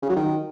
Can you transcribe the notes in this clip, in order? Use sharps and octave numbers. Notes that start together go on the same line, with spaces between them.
C#3
F#3
D#3